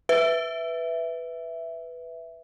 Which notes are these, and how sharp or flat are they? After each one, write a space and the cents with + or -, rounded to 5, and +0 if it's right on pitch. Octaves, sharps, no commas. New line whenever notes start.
B4 +5 E5 +0